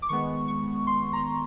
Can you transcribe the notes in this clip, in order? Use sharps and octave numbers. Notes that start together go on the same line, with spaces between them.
D6
D#3 G#3 B3 C#6
C#6
C6
A#5